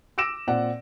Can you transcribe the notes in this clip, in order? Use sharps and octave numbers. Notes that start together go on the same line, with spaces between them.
D6 E6 A#6 D7 E7
A#2 C4 D5 F#5